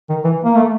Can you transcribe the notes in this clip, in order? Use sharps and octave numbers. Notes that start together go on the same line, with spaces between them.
D#3
E3
A#3
A3